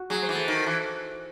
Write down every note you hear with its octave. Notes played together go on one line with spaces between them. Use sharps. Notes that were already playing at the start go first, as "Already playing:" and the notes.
Already playing: F#4
F#3 G#4
C5
E3
A4
D#3
E3